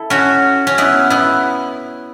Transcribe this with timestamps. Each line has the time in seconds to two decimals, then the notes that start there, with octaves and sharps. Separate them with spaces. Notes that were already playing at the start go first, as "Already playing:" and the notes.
Already playing: E4 A4
0.10 C#4 F#4
0.67 C#4
0.78 B3 E4
1.10 B3 E4